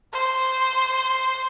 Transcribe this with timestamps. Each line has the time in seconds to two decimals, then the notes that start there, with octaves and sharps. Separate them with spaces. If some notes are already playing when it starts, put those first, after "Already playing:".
0.13 C5